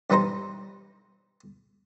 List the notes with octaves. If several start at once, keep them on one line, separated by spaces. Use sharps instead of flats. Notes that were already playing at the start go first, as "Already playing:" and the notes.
G2 E3 G3 D#4 C5 A#5